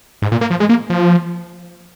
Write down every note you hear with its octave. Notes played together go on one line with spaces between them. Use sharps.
G#2
A#2
A#3
F3
G#3
A#3
F3